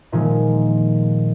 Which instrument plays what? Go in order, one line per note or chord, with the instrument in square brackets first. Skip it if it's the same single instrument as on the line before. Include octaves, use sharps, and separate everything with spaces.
[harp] A#2 D#3 F3 G#3 A#3